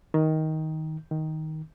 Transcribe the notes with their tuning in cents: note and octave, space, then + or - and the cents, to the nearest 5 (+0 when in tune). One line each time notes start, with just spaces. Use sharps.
D#3 +15
D#3 +10